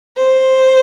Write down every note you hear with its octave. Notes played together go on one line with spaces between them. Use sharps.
C5